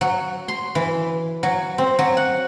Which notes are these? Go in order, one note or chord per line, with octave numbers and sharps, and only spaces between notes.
F#3
C6
E3
F#3
C4
F#3
F#5